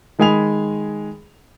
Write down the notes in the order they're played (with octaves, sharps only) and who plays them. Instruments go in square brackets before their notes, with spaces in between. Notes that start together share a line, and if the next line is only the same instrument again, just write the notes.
[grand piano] D#3 G#3 G#4 G#5 B5 F7